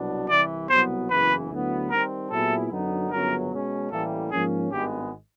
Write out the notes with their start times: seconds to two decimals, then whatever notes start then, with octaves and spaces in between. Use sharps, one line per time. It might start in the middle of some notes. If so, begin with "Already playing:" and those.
Already playing: C2 B2 F#3 B3 D4
0.29 C2 C3 E3 D5
0.69 C2 B2 F#3 B3 C5
1.10 F#1 E2 C#3 E3 B4
1.50 D2 D3 F#3 B3 E4
1.90 D#3 G3 C4 A#4
2.31 A#2 F#3 B3 E4 G#4 A4
2.71 F#2 D3 F#3 B3 D#4
3.11 G1 F#2 C#3 F#3 B3 A#4
3.51 B2 G#3 C#4
3.91 A1 A2 E3 G3 A#3 A4
4.31 G#2 F3 A#3 C#4 G#4
4.72 G#1 G2 D#3 G#3 B3 G4